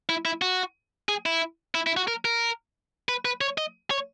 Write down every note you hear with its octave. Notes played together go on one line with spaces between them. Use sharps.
E4
E4
F#4
G#4
E4
E4
E4
F#4
A#4
A#4
B4
B4
C#5
D#5
C#5